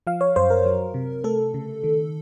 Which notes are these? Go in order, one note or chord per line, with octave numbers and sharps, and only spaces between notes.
F3 F5
C#5
F#2 C5
A#4
F#3
C3
A3 A4
C#3
D#3